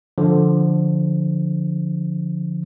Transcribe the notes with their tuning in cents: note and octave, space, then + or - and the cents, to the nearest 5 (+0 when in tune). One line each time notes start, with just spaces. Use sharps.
D3 +0 F3 +0